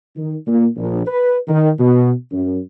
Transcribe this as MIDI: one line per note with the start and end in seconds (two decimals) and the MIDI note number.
0.16 0.35 51
0.46 0.66 46
0.77 1.06 34
1.06 1.37 71
1.48 1.72 51
1.79 2.12 47
2.32 2.59 42